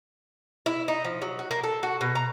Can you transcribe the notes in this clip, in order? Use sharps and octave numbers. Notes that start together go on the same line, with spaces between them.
E4
D#4
F3
F#3
F#4
A#3
A4
F#4
B2
A#5